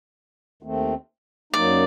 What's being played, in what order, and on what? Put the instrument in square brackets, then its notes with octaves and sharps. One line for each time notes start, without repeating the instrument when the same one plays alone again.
[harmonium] D#2 D#3 A3 C4
[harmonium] F#2 F#3 A#3 D#4 [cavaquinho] D5